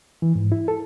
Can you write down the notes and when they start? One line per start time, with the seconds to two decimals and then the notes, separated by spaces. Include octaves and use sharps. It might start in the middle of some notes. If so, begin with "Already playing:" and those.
0.22 E3
0.35 G#2
0.52 E4
0.68 A4